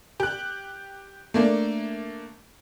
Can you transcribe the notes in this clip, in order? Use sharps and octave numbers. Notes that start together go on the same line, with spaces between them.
G4 F#6
A3 A#3 D4